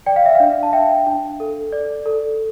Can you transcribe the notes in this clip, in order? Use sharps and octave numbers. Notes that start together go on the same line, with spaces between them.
D5 G5
F5
E5
D4 F5
A5
D4 E5 G5
D4
A4
D5
A4